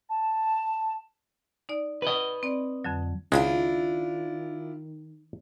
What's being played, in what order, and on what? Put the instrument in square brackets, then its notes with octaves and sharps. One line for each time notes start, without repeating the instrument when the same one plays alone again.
[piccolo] A5
[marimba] D#4 D5
[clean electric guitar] B4 D#5
[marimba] C4 D5
F2 D3 F#3
[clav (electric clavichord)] C#2 G#3 [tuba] D#3 [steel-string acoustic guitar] D4 E4 F4